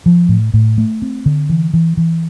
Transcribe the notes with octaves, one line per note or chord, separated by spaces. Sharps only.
F3
A2
A2
A3
C4
D3
E3
E3
E3